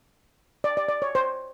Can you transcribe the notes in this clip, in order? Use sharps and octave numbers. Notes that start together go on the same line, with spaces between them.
D5
D5
D5
C#5
C5